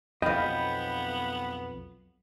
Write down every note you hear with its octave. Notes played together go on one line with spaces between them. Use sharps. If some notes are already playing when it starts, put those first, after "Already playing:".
B1 F2 B3 D#5 F5 G5 B5 G6